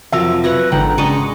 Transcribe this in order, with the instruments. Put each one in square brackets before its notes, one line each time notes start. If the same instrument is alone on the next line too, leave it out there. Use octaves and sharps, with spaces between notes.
[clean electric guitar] F2 C3 E5 [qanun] F3 F#3 A#4
[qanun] F#3 C#5 F#5 [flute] B4 [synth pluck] A#6
[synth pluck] G#1 D3 G5 [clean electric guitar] G#2 [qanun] F#5 [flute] A#5
[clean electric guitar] C#3 [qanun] G#3 D4 D#5 [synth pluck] C#7